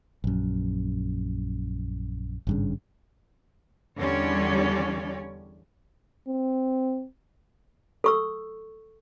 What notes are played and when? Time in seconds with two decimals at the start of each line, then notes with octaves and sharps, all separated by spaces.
0.24 A#1 F#2
2.47 G#1 G2 C#3
3.98 E2 D3 G3 C#4 C#5 D5
6.28 C4
8.04 A4 C#6 E6